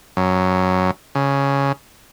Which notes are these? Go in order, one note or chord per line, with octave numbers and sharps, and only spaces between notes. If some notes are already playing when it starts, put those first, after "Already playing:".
F#2
C#3